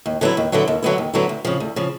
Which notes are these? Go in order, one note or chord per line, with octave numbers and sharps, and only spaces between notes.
D#2
D3 F#3 B3 E4
D#2
D3 F#3 B3 E4
D#2
D3 F#3 B3 E4
D#2
D3 F#3 B3 E4
D2
C#3 F3
D2
C#3 F3